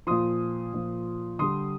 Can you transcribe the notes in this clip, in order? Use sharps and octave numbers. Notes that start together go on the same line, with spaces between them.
A#2 F3 C6 D#6
A#2 F3
D3 G3 C6 D#6